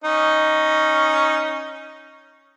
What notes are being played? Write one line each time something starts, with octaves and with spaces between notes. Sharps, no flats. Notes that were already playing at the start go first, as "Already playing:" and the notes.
C#4 D#4